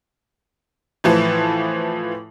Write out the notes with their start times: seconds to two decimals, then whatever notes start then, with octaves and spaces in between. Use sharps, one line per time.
1.04 A2 E3 F3